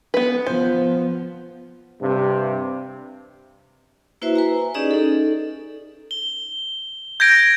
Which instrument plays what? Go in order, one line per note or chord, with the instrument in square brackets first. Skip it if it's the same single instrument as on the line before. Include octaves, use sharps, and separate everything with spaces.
[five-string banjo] B3 B4
[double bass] F3 B3 [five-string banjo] C5
[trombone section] G2 C3
[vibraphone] A#3 E4 F#4 B4 C5 E5
B4 G#5 A#5
C#4 D#4 G4 G#4 D5 D#5
D#4 A4
[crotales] G7
G6 G#6 A#6 D7